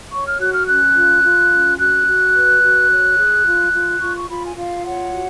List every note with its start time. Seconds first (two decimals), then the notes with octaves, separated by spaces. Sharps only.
0.11 C#5 C#6
0.26 F6
0.40 F#4 F#6
0.54 F6
0.68 C#4 F#6
0.96 F4
1.23 F4
1.51 C#4
1.79 F#4 F#6
2.07 F#4
2.34 B4
2.63 F#4
2.90 C#5
3.18 G#4
3.46 F4
3.74 F4
4.01 F4 C#6
4.15 C#6
4.28 F4 B5
4.43 G#5
4.56 F4 F5
4.84 C#5 F#5
5.12 F#4